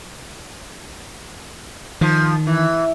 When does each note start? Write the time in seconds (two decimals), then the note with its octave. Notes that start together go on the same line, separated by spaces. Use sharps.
2.01 D#3 F3
2.47 E3